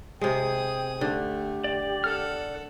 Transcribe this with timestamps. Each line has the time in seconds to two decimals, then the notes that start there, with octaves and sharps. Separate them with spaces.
0.21 C3 G#3 G#4 G5 D#6
1.01 D3 A3 G4
1.64 D5
2.04 A4 D5 F#5 F6